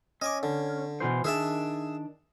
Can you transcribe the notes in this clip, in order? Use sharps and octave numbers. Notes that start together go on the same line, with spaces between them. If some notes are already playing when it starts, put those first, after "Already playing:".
C#4 D#5 G#5 D6
D3
B2 E3 C5
D#3 D4 G#4 E5 A5